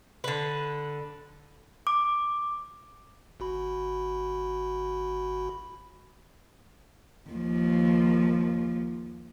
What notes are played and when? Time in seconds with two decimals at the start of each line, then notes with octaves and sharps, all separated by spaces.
0.24 D3 B4
1.87 D6
3.40 G1 F#4 B5
7.30 D#2 F3